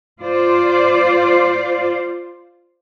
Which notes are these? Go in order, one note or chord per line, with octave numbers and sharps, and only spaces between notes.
F4 C5 D5